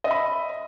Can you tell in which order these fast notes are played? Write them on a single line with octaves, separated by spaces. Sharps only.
D#5 E5 B5